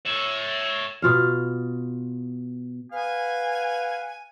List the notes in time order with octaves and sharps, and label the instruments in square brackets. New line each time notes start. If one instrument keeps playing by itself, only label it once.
[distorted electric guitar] C#5 E5
[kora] B2 F4 F5
[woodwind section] B4 F5 F#5 G#5